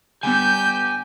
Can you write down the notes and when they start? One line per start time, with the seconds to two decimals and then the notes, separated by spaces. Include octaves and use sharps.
0.23 D3 G3 B3 G4 F#5 G#5 G6